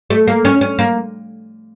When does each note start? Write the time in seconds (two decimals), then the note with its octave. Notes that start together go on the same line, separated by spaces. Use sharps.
0.10 A3
0.27 A#3
0.45 C#4
0.61 C#4
0.79 A#3